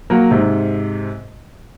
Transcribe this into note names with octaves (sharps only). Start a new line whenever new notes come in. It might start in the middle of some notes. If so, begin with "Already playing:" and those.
F#3 A#3
G#2 C3